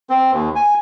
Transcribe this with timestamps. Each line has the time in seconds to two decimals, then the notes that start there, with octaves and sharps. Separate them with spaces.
0.10 C4
0.32 D#2
0.56 G#5